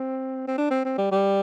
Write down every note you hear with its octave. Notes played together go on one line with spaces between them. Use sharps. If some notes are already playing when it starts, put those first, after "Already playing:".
Already playing: C4
C4
D4
C4
C4
G3
G3